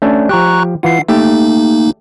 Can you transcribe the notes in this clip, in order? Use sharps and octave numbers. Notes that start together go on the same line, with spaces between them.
A3 C#4 D4
F3 G4 A#5 C#6 F#6
E3 F4 F#5 C7
A3 A#3 D#4 G4